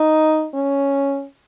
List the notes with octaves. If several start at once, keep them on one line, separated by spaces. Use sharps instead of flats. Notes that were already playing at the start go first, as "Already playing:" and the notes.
Already playing: D#4
C#4